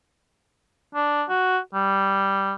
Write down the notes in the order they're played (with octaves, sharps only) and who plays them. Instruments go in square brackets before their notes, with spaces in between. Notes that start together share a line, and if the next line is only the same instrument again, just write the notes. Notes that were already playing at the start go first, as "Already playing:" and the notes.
[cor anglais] D4
F#4
G3